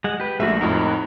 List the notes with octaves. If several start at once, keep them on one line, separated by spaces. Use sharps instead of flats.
G#3 F#5
G4 B4
A#1 G#3 A3 F#4 E5
F2 A2 D#4 A#4 F#5